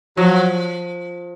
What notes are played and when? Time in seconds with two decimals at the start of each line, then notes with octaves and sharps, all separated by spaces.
0.17 F3 F#3